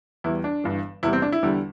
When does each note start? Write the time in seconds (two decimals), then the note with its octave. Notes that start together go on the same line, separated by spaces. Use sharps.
0.24 E2 E3 G3 E4
0.44 D4
0.64 G1 G2 E3
1.03 E2 C3 G3 E4
1.13 C4
1.22 D4
1.32 E4
1.43 E2 D3 G3